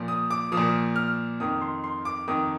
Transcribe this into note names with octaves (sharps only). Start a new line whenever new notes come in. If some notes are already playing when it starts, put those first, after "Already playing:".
Already playing: A#2 F3
D#6
D6
F3 D#6
A#2
F6
F2 D#3 D#6
C6
C6
D6
F2 D#3 D#6